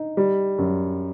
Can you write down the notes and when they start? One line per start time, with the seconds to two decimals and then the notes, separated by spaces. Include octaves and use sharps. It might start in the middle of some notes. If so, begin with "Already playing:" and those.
Already playing: D#4
0.17 G3
0.58 F#2